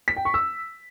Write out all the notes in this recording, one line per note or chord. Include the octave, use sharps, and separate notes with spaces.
B6
G5
C#6
E6